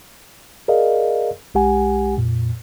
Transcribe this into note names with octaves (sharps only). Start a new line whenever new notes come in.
G#4 A#4 D5 D#5 F5
B1 G#3 G4 F#5 G#5
F2 A#2